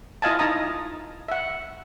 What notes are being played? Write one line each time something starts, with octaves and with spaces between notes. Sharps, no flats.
E4 F4 D#5 F5 G#5 A5
D#4 A5 A#5 D#6
E5 F#5